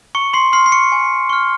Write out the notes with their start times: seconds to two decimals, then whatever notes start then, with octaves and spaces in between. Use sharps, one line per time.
0.15 A#5 C#6 C#7
0.33 C6 C7
0.53 C6 F6 C7
0.66 C7
0.72 C#6 C#7
0.92 G#5
1.29 C#6 F6